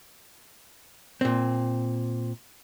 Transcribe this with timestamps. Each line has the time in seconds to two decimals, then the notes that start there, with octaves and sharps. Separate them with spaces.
1.21 A#2 C4